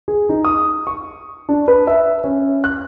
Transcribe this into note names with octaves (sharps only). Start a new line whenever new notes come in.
G#4
D#4
D#6
C#6
D4
B4
E5
C#4
F#6